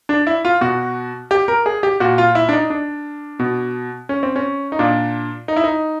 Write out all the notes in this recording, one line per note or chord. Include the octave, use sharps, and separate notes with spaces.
D4
E4
F4
B2 F#4
G4
A#4
G#4
G4
A#2 F#4
F4
E4
D4
D#4
D4
B2
C#4
C4
C#4
D#4
A#2 D4
D#4
E4
D#4